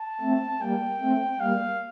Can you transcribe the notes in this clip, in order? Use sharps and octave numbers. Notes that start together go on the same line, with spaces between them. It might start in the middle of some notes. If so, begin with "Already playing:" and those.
Already playing: A5
A3 C4
G3 A#3 G5
A3 C4
G3 A#3 F5